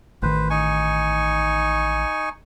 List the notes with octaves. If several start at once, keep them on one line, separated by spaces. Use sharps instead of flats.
A1 D#3 B4 C5
D#4 G#5 C#6